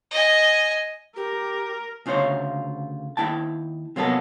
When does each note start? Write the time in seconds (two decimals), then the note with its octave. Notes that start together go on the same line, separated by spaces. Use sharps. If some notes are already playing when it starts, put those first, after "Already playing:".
0.11 D#5 G#5
1.16 G4 A#4
2.06 D2 C#3 F4 C5 C#5
3.17 D#2 F#3 E4 G5 A5
3.96 C3 F#3 A#3 B3 F#4 A4